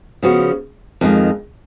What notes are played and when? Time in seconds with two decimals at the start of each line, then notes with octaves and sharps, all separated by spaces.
0.23 C#3 F3 B3 F#4
1.01 F2 D#3 G#3